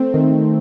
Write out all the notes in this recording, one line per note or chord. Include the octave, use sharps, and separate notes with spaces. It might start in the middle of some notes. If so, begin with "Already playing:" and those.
Already playing: A3 C4
D#3